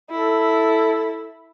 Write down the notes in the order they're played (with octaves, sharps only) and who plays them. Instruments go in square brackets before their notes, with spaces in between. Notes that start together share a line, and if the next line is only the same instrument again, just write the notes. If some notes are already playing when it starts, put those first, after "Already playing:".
[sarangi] E4 [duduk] A4